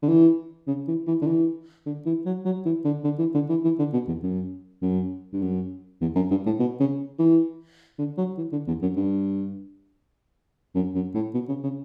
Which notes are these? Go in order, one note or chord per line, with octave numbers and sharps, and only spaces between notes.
D3
E3
C#3
E3
E3
D3
E3
D3
E3
F#3
F#3
E3
D3
D3
E3
D3
E3
E3
D3
B2
E2
F#2
F#2
G2
F#2
E2
F#2
G2
A2
B2
C#3
E3
D3
F#3
E3
D3
E2
F#2
G2
F#2
F#2
A2
B2
C#3
C#3